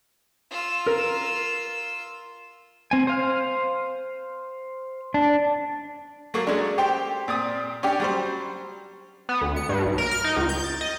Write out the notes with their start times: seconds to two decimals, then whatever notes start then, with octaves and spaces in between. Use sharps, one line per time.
0.51 F4 E6
0.86 A#4
2.91 C4 G#5
3.07 C5 F5 F6
5.14 D4
6.34 F#3 A3 A#3
6.47 F#3 G#3 A3 C#4 D4
6.78 G4 C5 G5
7.28 A#2 C4 D#6
7.83 C#4 D4 G4
8.00 F#3 G3 C5
9.29 B3
9.42 D2
9.56 C#7
9.69 G2
9.85 B1
9.98 A#4
10.11 F6
10.24 D#4
10.36 C#2
10.49 G6
10.64 A6
10.81 D#5